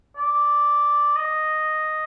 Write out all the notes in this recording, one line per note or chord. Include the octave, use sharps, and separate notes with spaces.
D5
D#5